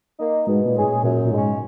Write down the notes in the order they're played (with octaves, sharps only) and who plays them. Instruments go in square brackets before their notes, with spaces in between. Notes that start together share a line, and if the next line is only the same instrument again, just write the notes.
[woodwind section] A#3 D#4
[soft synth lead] G#2 [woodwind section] B2
[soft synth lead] A#2
[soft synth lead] G#2 [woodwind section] G#3 C#4 G#4
[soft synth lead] A#2
[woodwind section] F#2 [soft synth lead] A#2
[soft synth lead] A#2
[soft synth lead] G#2 [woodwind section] C#3 G#3 C#4